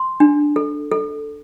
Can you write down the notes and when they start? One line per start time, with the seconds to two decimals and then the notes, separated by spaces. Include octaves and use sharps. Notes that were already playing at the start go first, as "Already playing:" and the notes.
Already playing: C6
0.20 D4
0.56 A4
0.91 A4